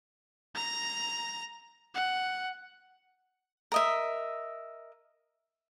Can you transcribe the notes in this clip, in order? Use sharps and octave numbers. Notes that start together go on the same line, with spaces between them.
A#5 A#6
F#5
A#4 D#5 E5